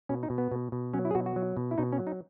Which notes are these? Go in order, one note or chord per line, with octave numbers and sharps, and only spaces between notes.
B2 C#4
D#4
B2
B3
B2
B2
F#3 C#4
E4
G#4
B2 F#4
F#4
F#3
B2
E4
B2 D#4
C#4
F#3
D#4